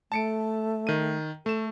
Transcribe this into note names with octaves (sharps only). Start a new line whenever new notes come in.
A3 A5 C#7 D7
D#3 D#7
A3 A4 E7